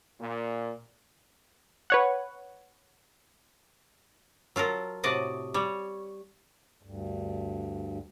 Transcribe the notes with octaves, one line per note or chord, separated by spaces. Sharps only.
A#2
B4 C#5 F#5
F#3 F4 A4 A#4
A2 C3 F#4 D5 D#5
G3 C#5
D2 G2